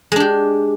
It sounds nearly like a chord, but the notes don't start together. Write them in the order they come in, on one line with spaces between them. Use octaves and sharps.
G#3 D4 G4